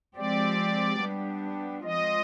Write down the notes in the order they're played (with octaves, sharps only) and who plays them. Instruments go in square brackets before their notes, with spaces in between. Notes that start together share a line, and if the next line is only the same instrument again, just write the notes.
[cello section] F3 G#3 C4 G4 [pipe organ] D5
[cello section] G3 B3 D4 G4
[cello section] F3 G#3 C4 F4 [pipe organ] D#5